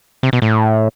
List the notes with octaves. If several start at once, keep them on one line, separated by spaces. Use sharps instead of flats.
C3
B2
A2